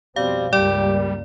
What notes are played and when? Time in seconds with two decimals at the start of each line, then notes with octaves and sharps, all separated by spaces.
0.16 F2 B2 G3 C4 F5
0.53 C#2 G2 G3 A#3 G4 D5